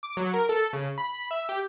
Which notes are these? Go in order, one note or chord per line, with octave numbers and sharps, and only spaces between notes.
D6
F#3
A#4
A4
C#3
B5
E5
G4